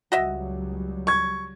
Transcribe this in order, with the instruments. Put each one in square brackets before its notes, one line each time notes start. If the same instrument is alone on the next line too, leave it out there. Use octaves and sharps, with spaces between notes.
[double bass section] C#2 F#3 G3 [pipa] F#4 D#5 E5
[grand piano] C#6 G#6